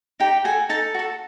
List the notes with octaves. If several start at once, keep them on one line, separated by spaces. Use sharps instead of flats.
D#4 G4 G5
F#4 G#4 A4 G#5
D#4 A4 A5
F#4 A4